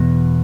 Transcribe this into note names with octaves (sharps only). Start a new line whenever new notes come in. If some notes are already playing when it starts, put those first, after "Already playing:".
Already playing: E2 B2